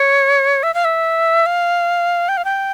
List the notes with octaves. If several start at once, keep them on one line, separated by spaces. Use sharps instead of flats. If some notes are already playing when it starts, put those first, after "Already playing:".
Already playing: C#5
E5
F5
E5
F5
G5
F5
G5